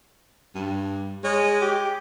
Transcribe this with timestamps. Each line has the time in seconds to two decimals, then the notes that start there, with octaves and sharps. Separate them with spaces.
0.55 G2
1.24 G#3 C#5
1.62 G4